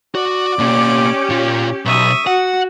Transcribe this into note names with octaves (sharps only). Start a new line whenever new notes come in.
F#4 D5
B2 A#3 C#4 G4
A#2 F4
B1 E5 C#6 D#6
F#4 F#5